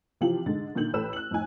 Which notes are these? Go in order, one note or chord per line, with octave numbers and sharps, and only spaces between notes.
C3 E3 F3 F4 G4 F#7
G#2 D3 G#3 A6
A#2 D3 D#3 G6 F#7
A1 A4 B4 E6 E7
F#6 F#7
F2 A2 D#4 G#5